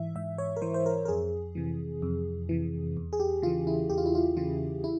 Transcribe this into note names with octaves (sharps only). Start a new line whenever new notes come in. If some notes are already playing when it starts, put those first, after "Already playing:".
Already playing: G#2 E3 E5
G#2 E5
C#5
A#4
E3 C5
C5
A#4
A#4
F2 G#4
C3 E3
F2
C3 E3
E2
G#4
G4
C#3 E3 F4
E4
E2 G4
F4
E4
F4
C#3 E3 F4
E4